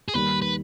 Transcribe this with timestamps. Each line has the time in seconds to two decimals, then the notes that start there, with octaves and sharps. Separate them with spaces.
0.08 G#4
0.14 D#2 D#3 G3 B4
0.42 B4